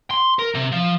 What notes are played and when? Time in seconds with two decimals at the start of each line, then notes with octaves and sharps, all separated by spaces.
0.11 C6
0.39 A#4
0.55 C3
0.72 F3